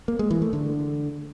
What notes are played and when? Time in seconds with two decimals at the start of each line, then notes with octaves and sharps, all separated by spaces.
0.08 A#3
0.19 G#3
0.31 E3
0.42 A3
0.53 D3